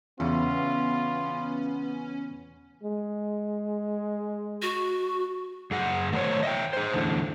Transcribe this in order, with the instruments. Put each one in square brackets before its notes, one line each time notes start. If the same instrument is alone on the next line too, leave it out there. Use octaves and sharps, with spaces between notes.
[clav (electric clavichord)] E2 C#3 [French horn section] B3 [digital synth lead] C#4 [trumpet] F4
[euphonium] G#3
[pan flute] F#4
[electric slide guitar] F#2 G#4 F#5
D#3 A3 G4 C5 C#5
D#5 E5 G5
G#4 C5
E2 A2 D3